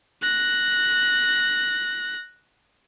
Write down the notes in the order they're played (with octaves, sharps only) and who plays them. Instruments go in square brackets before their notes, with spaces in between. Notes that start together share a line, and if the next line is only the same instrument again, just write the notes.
[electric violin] F#6 A#6